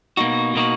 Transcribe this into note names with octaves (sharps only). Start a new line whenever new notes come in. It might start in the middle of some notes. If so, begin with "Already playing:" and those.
B2 A#3 D#4 F#4
B2 A#3 D#4 F#4